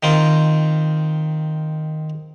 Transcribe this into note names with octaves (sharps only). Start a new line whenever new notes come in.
D#3 C4 F4